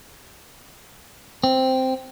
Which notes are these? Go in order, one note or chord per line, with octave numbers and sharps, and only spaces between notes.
C4